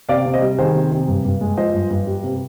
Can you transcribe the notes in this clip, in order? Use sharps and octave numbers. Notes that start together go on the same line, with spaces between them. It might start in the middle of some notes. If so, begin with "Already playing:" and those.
C3 D5 F5
C3
C5 D#5
G3
D#3 G#4 C5
C3
C3
G2
G2
G#3
F3 C5 D#5
G2
G2
G3
C3